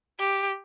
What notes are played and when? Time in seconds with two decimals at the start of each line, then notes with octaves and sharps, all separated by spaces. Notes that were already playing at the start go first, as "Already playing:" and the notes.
0.19 G4